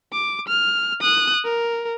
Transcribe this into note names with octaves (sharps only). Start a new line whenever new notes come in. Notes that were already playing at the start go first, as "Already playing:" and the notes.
D6
F6
D#6 F#6
A#4